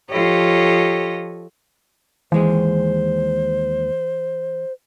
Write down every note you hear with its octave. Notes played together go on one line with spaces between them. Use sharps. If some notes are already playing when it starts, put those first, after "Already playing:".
F3 F4 G4 A4 C#5 D#5
D#2 E3 G#3 G#4 C5